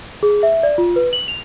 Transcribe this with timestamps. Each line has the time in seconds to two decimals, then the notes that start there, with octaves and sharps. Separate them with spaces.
0.23 G#4
0.43 E5
0.63 D5
0.78 F4
0.96 B4
1.13 F#7
1.28 F7